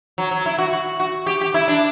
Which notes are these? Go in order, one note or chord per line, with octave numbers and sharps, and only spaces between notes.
F#3
F#3
E4
F#4
F#4
F#4
G4
G4
E4
D4